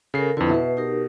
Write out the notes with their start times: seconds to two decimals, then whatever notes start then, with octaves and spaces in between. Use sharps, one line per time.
0.14 C#3 A4 A#4 C7
0.37 F2 D3 E4 B4
0.50 B2 B4 E5
0.77 D#4 G4 A#4